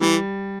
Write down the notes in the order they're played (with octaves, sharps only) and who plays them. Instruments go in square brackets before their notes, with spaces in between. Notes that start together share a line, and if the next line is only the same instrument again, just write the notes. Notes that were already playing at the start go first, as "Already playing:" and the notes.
[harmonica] E3 [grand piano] G3